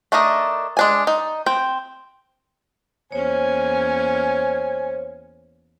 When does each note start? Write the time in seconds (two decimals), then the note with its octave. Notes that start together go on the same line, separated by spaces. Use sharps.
0.12 A3 D4 D#4 A#4 D#5
0.77 G#3 D4 G#5
1.07 D#4
1.46 C4 G5
3.12 E2 A#3 C#4 C5 C#5 G#5